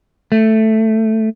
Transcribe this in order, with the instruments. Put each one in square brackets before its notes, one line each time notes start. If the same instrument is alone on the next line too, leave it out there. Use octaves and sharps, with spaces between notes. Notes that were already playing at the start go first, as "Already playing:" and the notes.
[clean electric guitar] A3